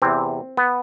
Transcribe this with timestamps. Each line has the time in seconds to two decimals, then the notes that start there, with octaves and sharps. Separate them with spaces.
0.02 E2 C3 E3 C4
0.57 B3